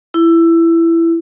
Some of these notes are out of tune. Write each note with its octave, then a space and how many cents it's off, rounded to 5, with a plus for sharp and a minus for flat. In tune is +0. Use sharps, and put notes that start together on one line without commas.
E4 +15